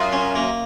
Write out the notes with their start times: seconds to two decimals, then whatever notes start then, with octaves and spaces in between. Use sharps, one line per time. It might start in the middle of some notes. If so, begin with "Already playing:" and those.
Already playing: F#2 F4
0.13 C#4
0.35 A#3